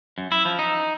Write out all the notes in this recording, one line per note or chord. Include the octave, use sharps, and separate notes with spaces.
F#2
E4
F3
D#4